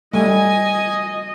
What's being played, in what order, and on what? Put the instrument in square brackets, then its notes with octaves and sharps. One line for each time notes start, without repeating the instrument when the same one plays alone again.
[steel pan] G3 A3 [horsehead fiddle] D#5 [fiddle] G#5